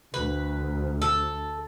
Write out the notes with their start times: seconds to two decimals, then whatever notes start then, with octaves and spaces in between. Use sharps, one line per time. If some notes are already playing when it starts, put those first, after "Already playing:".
0.14 D2 B4
1.02 A4